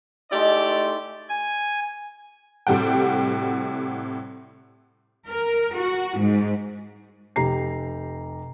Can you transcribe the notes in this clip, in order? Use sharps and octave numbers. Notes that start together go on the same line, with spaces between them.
G#3 A3 D#4 E4 G4 D5
G#5
A2 C3 G3 F#4 G5
A#4
F#4
G#2
F1 G4 A#5 C7